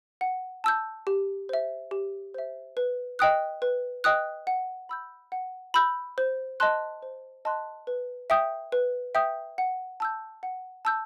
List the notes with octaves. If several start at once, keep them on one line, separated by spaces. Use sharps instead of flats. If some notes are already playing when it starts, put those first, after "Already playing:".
F#5
A5 E6 G6
G4
C5 E5
G4
C5 E5
B4
D#5 G5 D#6 F#6
B4
D#5 G5 D#6 F#6
F#5
B5 E6 G6
F#5
B5 E6 G6
C5
D#5 A5 C6 F#6
C5
D#5 A5 C6 F#6
B4
E5 G5 D#6 G6
B4
E5 G5 D#6 G6
F#5
A5 E6 G6
F#5
A5 E6 G6